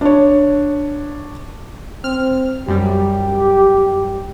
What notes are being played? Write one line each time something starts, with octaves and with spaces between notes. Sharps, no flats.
D4 C#5
C4 F6
F#2 G3 G4